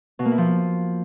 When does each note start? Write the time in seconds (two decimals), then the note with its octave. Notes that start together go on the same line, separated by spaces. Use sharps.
0.19 B2
0.25 A#3
0.32 E4
0.38 F3